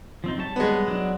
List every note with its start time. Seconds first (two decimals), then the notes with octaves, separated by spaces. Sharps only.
0.24 F3 C4 D#4
0.38 G3 C#5 A5
0.56 G#3 B3
0.88 F#3 D4